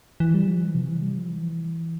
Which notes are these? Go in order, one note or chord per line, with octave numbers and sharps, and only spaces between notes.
E3
G3
F3
E3
C3
E3
G3
F3
E3